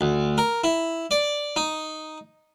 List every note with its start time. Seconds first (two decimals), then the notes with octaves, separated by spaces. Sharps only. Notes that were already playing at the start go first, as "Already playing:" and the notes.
0.01 D2
0.38 A#4
0.64 E4
1.11 D5
1.56 D#4